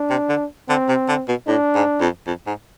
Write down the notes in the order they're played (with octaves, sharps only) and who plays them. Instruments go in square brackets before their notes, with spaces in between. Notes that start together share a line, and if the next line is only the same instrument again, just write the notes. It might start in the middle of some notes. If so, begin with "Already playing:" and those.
Already playing: [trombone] D4
[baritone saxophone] C3
D3
[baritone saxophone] D3 [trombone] C4
[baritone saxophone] C3
D3
B2
[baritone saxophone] A2 [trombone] D4
[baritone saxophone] G#2
F2
F2
G#2